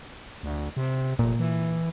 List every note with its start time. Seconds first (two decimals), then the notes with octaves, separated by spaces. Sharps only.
0.43 D2
0.77 C3
1.19 F1 A#2
1.39 E3